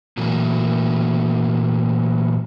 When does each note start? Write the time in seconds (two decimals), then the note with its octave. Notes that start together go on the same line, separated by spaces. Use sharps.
0.17 A#2 E3 F#3 A3 A#3